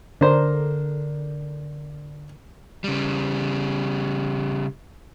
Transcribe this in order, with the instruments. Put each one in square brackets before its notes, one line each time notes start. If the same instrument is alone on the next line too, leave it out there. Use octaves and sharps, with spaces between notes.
[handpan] D3 A#4 [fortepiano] D4 C5
[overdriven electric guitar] C#3 G3